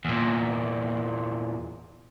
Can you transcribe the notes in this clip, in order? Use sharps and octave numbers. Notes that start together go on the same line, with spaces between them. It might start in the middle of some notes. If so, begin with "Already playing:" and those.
E2 A#2